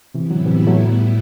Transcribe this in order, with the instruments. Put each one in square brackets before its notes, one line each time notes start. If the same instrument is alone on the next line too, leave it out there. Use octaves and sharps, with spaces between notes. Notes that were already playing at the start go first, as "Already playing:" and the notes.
[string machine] A2 G3 B3 E4 [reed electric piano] C3 E3
[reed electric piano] D3 F#3
C3 E3
F#3 A3